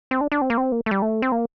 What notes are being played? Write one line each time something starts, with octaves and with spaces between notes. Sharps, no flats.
C4
D4
D4
C4
A#3
C4
A#3
A3
G3
A3
C4
A#3